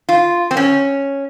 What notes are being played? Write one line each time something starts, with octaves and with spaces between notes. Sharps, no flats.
F4
C4
C#4